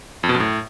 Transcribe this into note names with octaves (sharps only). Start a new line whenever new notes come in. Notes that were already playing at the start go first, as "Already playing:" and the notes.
F2
B2
F#2
A2